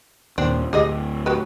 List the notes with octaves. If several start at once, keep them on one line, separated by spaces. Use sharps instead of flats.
D#2 A#2 D#3 C4 D4
D2 A2 G4 G#4 D#5
F#4 G4 B4